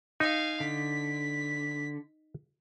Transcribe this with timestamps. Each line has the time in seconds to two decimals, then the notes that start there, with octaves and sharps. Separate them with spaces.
0.20 D#4 F5 G#5
0.60 D3 B6